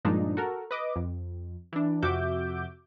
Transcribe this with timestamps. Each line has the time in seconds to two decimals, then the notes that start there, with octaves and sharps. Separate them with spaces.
0.05 G2 A#2 F3 G#3 D4 D#4
0.37 F#4 A4 A#4
0.71 B4 D#5 D6
0.96 F2
1.73 E3 D4
2.02 F2 C3 F#4 E5 D6 G6